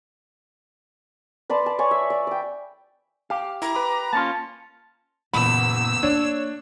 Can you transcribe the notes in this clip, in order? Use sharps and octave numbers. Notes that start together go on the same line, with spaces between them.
B4 D5 A5 C6
A5
C#5 D5 G#5 C#6
E5
D5
D5 G5
G4 F5
E4 A#5
B4 B5 D6
A#3 C#4 F4 A5
F#1 E2 A#2 B5 E6
A#3 D4 C#5